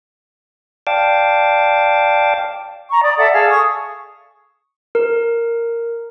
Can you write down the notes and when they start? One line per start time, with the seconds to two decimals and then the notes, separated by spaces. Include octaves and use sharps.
0.87 D5 F5 G5 A5 D6
2.91 A#5 C#6
3.02 D5 D#6
3.17 A4 D5 E5 F#5
3.33 G#4 A4 F5
3.50 C#6 D#6
4.95 A#4